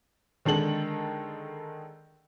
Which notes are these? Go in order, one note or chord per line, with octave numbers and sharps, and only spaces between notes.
D3 D#3 G#3 A4 F#7